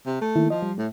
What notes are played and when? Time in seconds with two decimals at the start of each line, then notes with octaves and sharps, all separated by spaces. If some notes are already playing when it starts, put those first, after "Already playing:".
0.06 C3
0.21 A3
0.35 D#3 A#3 E4
0.50 F3 D#5
0.62 G3
0.78 A2 A3